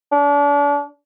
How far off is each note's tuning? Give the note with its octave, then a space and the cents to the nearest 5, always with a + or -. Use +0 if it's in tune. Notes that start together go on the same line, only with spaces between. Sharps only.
D4 -35